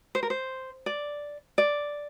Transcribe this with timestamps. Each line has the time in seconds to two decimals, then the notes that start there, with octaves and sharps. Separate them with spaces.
0.15 C5
0.23 A#4
0.30 C5
0.86 D5
1.58 D5